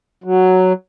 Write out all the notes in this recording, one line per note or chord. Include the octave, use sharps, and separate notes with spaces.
F#3